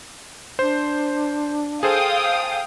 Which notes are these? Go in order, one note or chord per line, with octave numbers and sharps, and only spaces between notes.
D4 C5
G#4 A4 C5 F5 G5 D#6